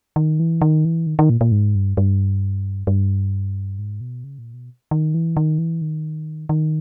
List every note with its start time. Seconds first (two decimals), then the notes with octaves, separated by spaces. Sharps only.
0.16 D#3
0.40 E3
0.62 D#3
0.85 E3
1.07 D#3
1.19 D#3
1.30 A#2
1.41 A#2
1.52 G#2
1.75 G2
1.97 G2
2.87 G2
3.79 G#2
4.01 B2
4.24 C#3
4.39 A#2
4.54 B2
4.91 D#3
5.14 E3
5.37 D#3
5.59 E3
5.82 D#3
6.49 D#3